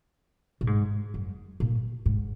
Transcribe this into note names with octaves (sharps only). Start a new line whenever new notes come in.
A#2
G#2
F#2
A#2
G#2